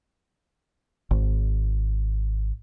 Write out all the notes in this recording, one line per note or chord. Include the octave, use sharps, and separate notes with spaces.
G#1